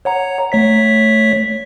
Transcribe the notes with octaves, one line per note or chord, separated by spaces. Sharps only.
C#5 F#5 A#5
A3 C#5 B6